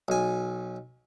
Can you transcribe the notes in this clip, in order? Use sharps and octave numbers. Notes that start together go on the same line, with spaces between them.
B1 G#5